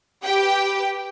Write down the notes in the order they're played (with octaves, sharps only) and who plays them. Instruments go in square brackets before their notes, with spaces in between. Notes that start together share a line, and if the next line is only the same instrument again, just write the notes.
[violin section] G4 B4 [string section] G5